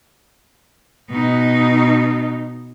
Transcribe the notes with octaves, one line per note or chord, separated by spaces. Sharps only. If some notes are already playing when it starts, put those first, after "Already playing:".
B2 D#4